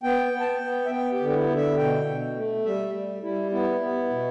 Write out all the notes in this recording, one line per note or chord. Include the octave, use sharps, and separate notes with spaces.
B3 G5
B3
A5
G5
B3
E5
B3 G5
G4
D3
G4
E4
D3
E5
B2 G5
B2
A3
G3 E5
G3
G3 E4
B3 E4
B3
B2